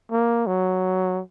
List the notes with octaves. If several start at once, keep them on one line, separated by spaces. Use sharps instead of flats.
A#3
F#3